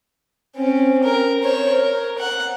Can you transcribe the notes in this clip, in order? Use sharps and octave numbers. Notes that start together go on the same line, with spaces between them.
C4 C#4
A#4
C5 C#5
A#4
F#5